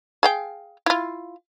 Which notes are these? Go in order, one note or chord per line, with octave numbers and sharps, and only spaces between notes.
G#4 F5 G5
E4 F4